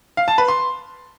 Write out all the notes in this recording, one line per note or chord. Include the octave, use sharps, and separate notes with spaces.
F5
A5
B4
C6